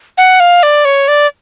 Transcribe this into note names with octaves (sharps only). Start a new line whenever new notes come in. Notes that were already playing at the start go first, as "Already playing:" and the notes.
F#5
F5
D5
C#5
D5